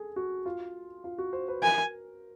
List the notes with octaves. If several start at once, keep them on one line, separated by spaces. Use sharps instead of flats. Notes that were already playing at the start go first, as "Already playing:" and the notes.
Already playing: G#4 A4
F#4
F4
F4
F#4
C5
B4
A#4 G#5